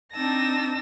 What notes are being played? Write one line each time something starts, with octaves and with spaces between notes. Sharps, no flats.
C4 D4 D#4 A5 E6 A#6